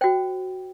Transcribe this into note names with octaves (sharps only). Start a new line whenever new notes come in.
F#4 C5 G5